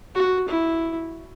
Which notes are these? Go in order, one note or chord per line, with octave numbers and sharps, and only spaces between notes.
F#4
E4